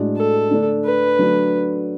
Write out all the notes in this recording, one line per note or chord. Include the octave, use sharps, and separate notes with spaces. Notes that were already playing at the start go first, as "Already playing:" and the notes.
Already playing: A2 G#3 D4 F#4
A4
D3 A3 D4
B4
D3 F#3 A3 D4